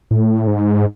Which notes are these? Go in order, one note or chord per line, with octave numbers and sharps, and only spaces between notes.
A2
G#2